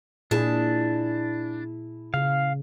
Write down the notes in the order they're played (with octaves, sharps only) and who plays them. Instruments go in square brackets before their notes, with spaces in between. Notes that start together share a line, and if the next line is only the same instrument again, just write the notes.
[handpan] A#2 G#4 [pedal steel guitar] D4 [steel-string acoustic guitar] E4 A5
[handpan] C#3 [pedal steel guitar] F5